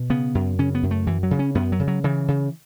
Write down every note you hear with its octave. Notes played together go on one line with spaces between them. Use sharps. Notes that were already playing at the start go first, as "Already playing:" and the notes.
Already playing: B2
C#3 B3
F#2
C#3 C#4
B3
F#2
A3
F#2 E3
F#3
C#3
C#4
F#2 B3
F#3
C#3
F#3
C#3 E3
C#3